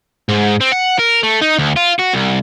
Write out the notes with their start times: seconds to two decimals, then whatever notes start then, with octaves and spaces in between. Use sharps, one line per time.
0.29 G#2
0.61 C4
0.72 F#5
0.99 A#4
1.23 A3
1.41 D#4
1.58 D2
1.76 F4
1.99 F#4
2.14 C2